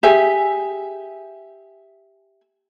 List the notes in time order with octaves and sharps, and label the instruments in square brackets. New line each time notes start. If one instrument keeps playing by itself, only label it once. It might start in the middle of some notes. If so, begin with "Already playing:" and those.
[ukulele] G4 G#4 E5 G#5